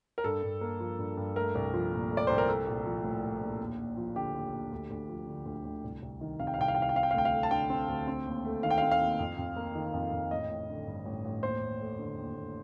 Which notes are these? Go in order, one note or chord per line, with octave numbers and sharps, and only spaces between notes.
A#4
G2 A4
G2
A#3
F3
G2
G2
A3 A#4
C2
F3
A#2
A3
D5
C2 C5
A#4
A3 A4
A#1
F3
A2
A3
A#1
D#2
D#2
F3
D3 G4
D#2
D#2
D2
D2
F3
D3
D2
D2
C2
C2
D#3
C3 F5
G5
F5
C2 G5
F5
C2 G5
F5
G5
C4 F5
G5
F5
D2 G5
F5
A3
A5
D3 G5
C4
D2
C4
D#2
A3
D#3 F5
G5
C4 F5
F5
D#2
F2
F2
A#3
D#3
F2
F2
A1 D#5
A1
D3
G2
A1
A1
D#2 C5
D#2
A3
D3
D#2
D#2